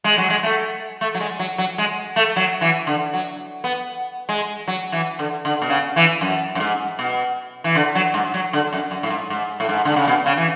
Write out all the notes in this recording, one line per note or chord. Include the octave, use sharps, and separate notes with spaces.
G#3
F#3
G#3
A3
A3
F#3
G#3
F#3
F#3
G#3
A3
F#3
E3
D3
F#3
B3
G#3
F#3
E3
D3
D3
B2
C#3
E3
F#2
F#2
G#2
B2
E3
D3
F#3
G#2
F#3
D3
F#2
F#2
A2
G#2
G#2
A2
G#2
D3
C#3
B2
C#3
E3